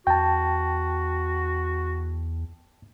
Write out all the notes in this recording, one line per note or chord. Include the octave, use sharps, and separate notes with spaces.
E2 F#4 G5 A5